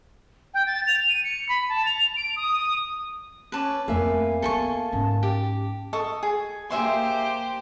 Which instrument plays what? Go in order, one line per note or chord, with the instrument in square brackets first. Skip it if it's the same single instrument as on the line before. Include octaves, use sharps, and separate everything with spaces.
[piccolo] G5
A6
F7
D#7
C#7
B5
A5
F7
D7
D#6
D#6
[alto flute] C#4 [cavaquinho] B4 A5 D6
[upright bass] F2 A3 [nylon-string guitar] A#3 E5 [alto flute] G#5
[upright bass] B3 D4 [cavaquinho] A4 G#5 C#6 [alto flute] A5
[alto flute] A5
[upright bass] G#2 C#4
[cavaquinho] G4
A4 D#5 C#6
G#4
[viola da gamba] A#3 G4 C5 [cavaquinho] G#4 E5 C6